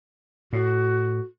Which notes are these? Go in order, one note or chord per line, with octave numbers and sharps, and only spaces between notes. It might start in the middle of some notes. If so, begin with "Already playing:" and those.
A2 F#4